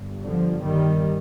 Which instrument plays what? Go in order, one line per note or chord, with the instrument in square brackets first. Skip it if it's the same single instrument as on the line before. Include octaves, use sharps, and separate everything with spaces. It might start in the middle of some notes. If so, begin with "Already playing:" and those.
Already playing: [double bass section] G1 G2
D3 F3
D#3 G3